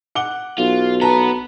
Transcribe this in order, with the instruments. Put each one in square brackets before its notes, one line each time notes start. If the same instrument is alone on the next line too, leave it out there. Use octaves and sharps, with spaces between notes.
[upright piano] F#5 D6 G7
[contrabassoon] B1 [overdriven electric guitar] F4
[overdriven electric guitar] B3 B4 [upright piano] A5 A#5